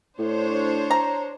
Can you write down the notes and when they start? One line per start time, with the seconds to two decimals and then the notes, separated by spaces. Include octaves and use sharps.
0.19 A2 D4 C5 C#5
0.91 A#5